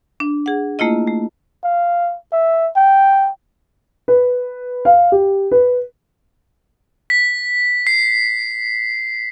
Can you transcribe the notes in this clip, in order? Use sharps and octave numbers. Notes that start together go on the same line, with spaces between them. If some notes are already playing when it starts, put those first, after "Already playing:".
D4
G#4 F#5
A3 A#3 E4 F4 D#5
A3
F5
E5
G5
B4
F5
G4
B4
B6
C7